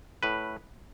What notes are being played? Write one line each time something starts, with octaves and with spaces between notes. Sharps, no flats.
A2 B4